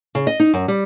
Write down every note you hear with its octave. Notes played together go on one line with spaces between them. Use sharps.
C#3
D#5
D#4
F#2
G3